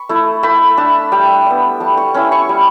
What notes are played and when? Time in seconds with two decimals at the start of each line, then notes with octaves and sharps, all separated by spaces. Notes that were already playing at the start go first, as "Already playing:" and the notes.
Already playing: B5 C#6
0.09 A3 E4
0.43 A3 B5
0.77 D4 A5
1.12 G3 G5
1.47 B3 D4
1.80 G3 A5
1.97 C#6
2.14 C#4 E4 B5
2.32 C#6
2.49 G3